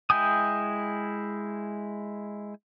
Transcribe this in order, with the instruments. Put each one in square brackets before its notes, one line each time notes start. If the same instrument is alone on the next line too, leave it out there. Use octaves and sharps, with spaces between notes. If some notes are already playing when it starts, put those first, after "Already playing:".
[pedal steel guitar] G#3 E4 G5 G#5 D#6